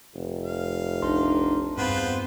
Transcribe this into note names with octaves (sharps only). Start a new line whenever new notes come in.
F1
F5
A#1 D4 D#4 C6
E2 G2 B3 C4 F4 B4 C5 B5